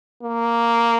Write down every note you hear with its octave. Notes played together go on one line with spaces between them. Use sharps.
A#3